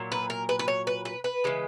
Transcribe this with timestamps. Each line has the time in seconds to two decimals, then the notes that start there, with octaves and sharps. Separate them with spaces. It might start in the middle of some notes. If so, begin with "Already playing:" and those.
Already playing: A#2 F#3
0.12 B4
0.30 A#4
0.49 B4
0.59 B4
0.68 C#5
0.87 B4
1.05 B4
1.24 B4
1.44 C#3 E3 G#3